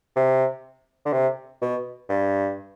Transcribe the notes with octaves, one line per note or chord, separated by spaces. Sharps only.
C3
D3
C3
B2
G2